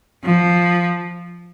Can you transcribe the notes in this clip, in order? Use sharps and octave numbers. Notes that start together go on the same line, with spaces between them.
F3